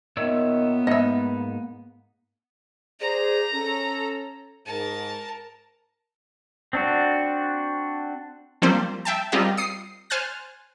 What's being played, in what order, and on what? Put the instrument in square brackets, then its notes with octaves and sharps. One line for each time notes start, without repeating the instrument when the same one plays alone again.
[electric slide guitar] A#2 C#5 E5 [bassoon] D#3 [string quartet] B3
[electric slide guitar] G#2 A#3 D#4 [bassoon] B4 [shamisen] D#5 E5
[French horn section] G#4 C5 D5 [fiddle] A#5
[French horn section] C#4 A4
[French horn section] G#2 [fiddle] A#4 A5
[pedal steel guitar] C4 D4 F#4
[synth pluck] F3 G3 A#3 C4 C5
E5 G5 A5
G3 C4 F4 G4 A#4 D#5
D#6 C7
C5 G#5 F6 F#6 A6